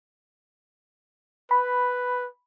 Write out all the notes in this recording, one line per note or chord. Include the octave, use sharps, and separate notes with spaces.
B4 B5